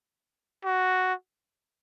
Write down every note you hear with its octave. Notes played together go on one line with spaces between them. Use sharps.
F#4